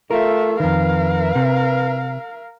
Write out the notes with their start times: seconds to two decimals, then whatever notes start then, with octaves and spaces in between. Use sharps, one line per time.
0.11 A3 F4 A#4 E5
0.60 F2 D#3 A#4 B4 F5
1.35 C3